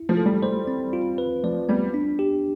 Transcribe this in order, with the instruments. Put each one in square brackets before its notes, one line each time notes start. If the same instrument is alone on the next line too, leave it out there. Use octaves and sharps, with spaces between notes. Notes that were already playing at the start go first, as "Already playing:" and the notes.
Already playing: [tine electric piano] E4
[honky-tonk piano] F3
[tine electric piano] A4
[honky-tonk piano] G3
[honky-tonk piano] G3 [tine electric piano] C5
[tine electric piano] C4
F4
B4
[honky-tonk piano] F3 [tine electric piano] D5
[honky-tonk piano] G3 [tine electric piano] B3
[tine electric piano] D4
G4